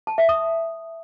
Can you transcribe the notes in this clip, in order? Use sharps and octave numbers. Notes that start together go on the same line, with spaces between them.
A5
E5
D#6